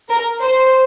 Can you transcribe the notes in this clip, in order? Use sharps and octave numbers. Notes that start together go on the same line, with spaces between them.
A#4
C5